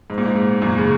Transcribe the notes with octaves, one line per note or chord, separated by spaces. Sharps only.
G#2
A#2
G#2
G#2
F#2 A#2
C#3